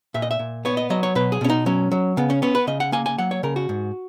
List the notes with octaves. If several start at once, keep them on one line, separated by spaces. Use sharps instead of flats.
A#2 E5
D#5
E5
A#2
B3 C#5
D#5
F#3 D#5
C#5
B2 B4
G#4
B2 C#4
D#4
F#3 C#4
F#3
C#3 B3
C#4
B3 C#4
B4
C#3 D#5
F#5
A#3 G#5
G#5
F#3 F#5
C#5
C#3 A#4
F#4
G#2